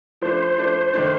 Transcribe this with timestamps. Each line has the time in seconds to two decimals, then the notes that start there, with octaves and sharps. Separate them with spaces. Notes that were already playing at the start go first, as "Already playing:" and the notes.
0.22 F3 A3 D4 C5
0.58 F3 A3 D4
0.93 D#3 A3 D4